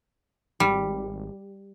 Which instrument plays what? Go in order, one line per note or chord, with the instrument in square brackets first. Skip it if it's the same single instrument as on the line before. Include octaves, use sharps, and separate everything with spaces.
[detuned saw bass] G#1 [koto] G3